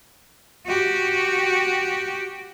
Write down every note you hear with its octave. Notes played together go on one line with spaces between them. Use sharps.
F#4 G4